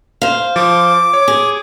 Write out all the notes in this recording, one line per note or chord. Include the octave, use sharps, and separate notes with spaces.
C5 F5
F3 D6
C#5
G#4